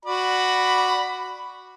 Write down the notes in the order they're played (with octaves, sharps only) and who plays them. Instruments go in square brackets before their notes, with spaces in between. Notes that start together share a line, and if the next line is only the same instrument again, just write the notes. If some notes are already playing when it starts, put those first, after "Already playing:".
[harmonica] F#4 D5 B5